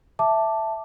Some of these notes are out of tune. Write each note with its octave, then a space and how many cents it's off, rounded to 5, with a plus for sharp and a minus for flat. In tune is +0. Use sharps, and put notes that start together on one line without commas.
E5 +0 A5 +0 D6 +0